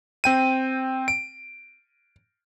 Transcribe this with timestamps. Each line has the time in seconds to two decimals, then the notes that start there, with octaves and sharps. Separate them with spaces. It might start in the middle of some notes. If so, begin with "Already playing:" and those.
0.24 C4 G5 D#7
1.08 D7